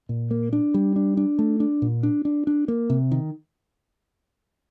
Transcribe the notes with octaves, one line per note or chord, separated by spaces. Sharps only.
A#2
A#3
D4
G3
D4
D4
A3
D4
A#2
D4
D4
D4
A#3
C3
D#3